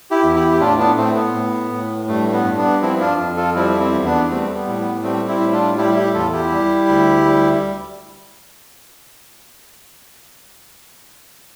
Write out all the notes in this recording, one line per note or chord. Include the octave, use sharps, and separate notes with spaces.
E4 G4
E2
E4 G4
G4
A2 D4 F4
B3 D4
A2 A3 C4
B3
A2
A2
G2 A3
B3
G2
B3 D4
F3 C4 E4
D4 F4
F2
F4 A4
G3 C4 E4
C4 E4
E2
B3 D4
G3 A3 C4
B3
A2
B3
G3 A3 C4
C4 E4
A2
D4 F4
G3 E4 G4
E4 G4
E2 F4 A4
E4 G4
G3
D2
G3